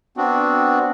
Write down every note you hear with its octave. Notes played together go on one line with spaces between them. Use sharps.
B3 C4 D4 F#4